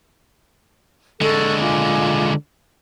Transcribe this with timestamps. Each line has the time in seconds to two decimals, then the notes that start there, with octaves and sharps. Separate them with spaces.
1.21 D3 G#3 A4 C#6
1.59 F4 G#5 D6